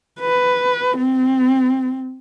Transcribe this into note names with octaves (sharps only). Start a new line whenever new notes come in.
B4
C4